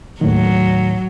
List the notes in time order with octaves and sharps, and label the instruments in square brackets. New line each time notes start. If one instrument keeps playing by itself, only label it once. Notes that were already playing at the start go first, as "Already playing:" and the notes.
[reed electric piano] D#2 A2 D#3 [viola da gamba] F#3